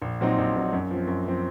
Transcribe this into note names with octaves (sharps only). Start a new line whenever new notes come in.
A#1
A#2 F#3 C4 D#4
A#1
A#2 F#3 C4 D#4
F#2
F3 C4
F#2
F3 C4